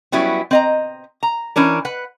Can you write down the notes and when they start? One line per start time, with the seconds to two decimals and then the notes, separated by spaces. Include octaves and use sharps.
0.12 F#3 G3 B3 C#4 E4
0.51 C4 D#5 A#5
1.23 A#5
1.56 E3 C#4 D4 A#4
1.85 B4 F#5